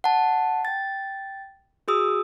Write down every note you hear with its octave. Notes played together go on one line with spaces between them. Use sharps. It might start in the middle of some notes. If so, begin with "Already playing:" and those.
F#5 A5
G5 A6
F#4 G#4 D#6 E6